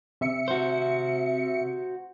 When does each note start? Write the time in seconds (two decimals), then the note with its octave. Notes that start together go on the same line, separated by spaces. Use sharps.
0.21 C3 E5 C#7
0.48 F#4 C5